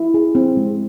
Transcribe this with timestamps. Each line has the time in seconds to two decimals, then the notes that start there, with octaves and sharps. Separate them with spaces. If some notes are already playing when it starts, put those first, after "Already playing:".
Already playing: E4
0.14 G#4
0.35 C4
0.57 G#3